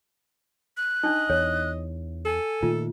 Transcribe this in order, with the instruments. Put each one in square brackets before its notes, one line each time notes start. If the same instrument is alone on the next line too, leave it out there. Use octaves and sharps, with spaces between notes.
[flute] F#6
[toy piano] D4 D#4 [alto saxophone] D#5
[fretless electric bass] E2 [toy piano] C#5
[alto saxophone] A4 [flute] G#5
[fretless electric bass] A#2 D#3 A3 [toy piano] F4